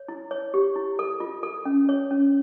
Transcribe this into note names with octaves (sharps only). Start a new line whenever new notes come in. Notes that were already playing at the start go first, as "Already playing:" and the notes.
Already playing: C#5
E4
C#5
G4
E4
A4
F4
A4
C#4
C#5
C#4